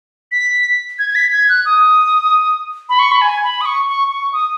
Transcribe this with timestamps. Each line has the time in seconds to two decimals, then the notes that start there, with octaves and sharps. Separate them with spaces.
0.32 B6
0.99 G#6
1.10 G#6
1.15 B6
1.32 G#6
1.49 F#6
1.66 D#6
2.89 B5
2.99 C#6
3.11 B5
3.21 G#5
3.43 B5
3.61 D#6
3.65 C#6
3.88 C#6
4.11 C#6
4.33 D#6